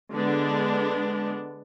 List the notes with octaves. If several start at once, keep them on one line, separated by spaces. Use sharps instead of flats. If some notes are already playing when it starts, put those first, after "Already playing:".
D3 G#3 B3 D4